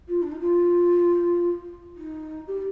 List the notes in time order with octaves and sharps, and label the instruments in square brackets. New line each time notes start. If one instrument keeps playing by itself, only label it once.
[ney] F4
D4
D#4
F4
D#4
G4